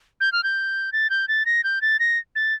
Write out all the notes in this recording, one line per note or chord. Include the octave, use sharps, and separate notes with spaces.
G6
F6
G6
A6
G6
A6
A#6
G6
A6
A#6
A6